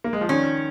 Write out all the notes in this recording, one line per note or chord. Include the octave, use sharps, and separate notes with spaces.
A#3
G#3
F3
D#3 C#4